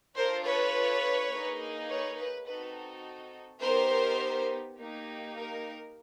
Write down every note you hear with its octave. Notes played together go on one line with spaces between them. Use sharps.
D4 F4 A4 A#4 C5
B4 C#5
A#3 D#4 G#4
B4 C#5
B4
C4 D#4 F#4 A4 B4
B3 D#4 G4 A#4 C5
A#3 D#4 G4
A#4